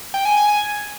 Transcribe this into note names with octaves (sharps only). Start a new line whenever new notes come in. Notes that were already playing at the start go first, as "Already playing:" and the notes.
G5
G#5
G#5
G#5